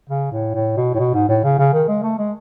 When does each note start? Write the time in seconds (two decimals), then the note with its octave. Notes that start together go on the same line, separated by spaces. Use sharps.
0.10 C#3
0.32 A2
0.55 A2
0.77 B2
0.95 A2
0.99 B2
1.14 G#2
1.29 A2
1.44 C#3
1.59 C#3
1.73 D#3
1.88 G#3
2.03 A3
2.18 G#3